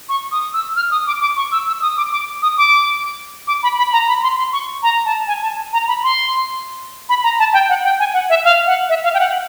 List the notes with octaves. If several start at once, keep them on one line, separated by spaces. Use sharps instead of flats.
C#6
D#6
E6
F6
D#6
D6
D6
C#6
E6
E6
D#6
D6
D6
D#6
D6
D6
B5
B5
A#5
B5
C6
C6
C#6
A#5
A5
G#5
A5
A#5
B5
C6
B5
A#5
A5
G5
F#5
G5
G#5
F#5
E5
F5
F#5
E5
F5
G5
F#5